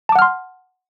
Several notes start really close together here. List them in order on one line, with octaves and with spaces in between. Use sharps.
A5 D6 F#5 F6 C6